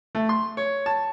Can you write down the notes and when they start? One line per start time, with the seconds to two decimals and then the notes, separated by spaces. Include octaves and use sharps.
0.15 A3
0.29 C6
0.57 C#5
0.86 A5